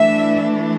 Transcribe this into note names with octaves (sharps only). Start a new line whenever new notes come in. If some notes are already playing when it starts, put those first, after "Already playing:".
Already playing: E3 A3 D4 E5